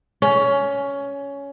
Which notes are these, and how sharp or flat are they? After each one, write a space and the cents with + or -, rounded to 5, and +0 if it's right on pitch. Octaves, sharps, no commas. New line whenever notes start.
C#4 +15